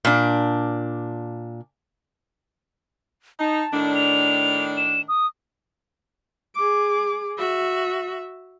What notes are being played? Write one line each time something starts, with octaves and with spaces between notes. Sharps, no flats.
A#2 D4
D#4 A5
A2 D#3 D4
F7
E7
D#6
G#4 D6
F#4 E5